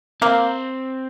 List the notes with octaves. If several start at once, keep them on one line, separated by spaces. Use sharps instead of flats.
A#3 C4